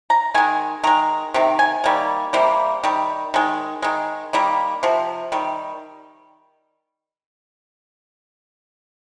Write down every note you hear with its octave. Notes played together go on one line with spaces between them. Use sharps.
A#5
D#3 G#3 G#5
D#3 G#3 A#5
C3 D#3
G#5
D#3 G3 A#3
C3 G3 A#3
D#3 G3
D#3 G#3
D#3 G#3
D#3 G3 A#3
C3 F3
D#3 G3